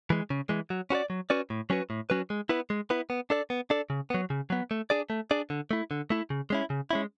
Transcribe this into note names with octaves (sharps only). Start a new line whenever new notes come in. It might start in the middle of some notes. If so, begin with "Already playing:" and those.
E3 G#3
C#3
E3 G#3
F#3
C#4 F#4 B4 D5
F#3
C#4 F#4 B4 D5
A2
F#3 C#4 F#4 B4
A2
F#3 C#4 F#4 B4
G#3
B3 E4 B4
G#3
B3 E4 B4
B3
D4 A4 D5
B3
D4 A4 D5
C#3
F#3 B3
C#3
F#3 B3
A3
D4 G#4 D5
A3
D4 G#4 D5
D3
A3 E4
D3
A3 E4
C#3
G#3 C#4 E4
C#3
G#3 C#4 E4